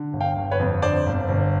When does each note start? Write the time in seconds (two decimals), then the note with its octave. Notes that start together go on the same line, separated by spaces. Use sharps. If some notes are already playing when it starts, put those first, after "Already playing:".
Already playing: D3
0.13 G1
0.21 F5 G5
0.36 G1
0.51 B4 C#5
0.60 F2
0.82 D3 C5 D5
1.06 G1
1.29 G1